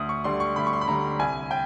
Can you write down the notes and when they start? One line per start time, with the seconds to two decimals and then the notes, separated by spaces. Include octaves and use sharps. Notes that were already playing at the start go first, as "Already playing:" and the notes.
Already playing: D2 D#6
0.09 C#6
0.24 D3 G3 C6
0.40 C#6
0.56 D2 B5
0.67 C#6
0.73 C6
0.81 B5
0.87 D3 G3 A#5
1.19 C2 G#5
1.51 G5